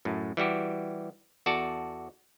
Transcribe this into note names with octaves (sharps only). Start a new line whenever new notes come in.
F#2 A2
E3 G3 F#4 G4
E2 F#4 A4 D5 A5